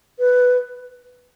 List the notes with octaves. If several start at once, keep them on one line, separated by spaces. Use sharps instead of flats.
B4